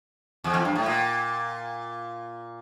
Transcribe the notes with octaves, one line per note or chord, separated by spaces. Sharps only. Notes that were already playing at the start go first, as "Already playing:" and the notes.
E2
F2
G2
A2
A#2